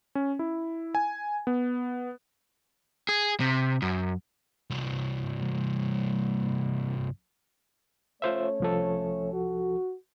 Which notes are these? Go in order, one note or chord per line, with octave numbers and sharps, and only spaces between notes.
C#4
E4
G#5
B3
G#4
C3
F#2
C2 G2
A3 C#4 F4 C5 C#5 E5
C2 F3 A4
F#4